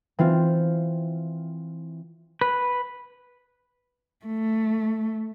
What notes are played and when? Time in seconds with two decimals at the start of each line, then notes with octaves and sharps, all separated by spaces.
0.19 E3 C4 F4
2.41 B4
4.26 A3